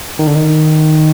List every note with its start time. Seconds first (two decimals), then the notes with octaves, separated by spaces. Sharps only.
0.19 D#3
0.27 D3
0.35 D#3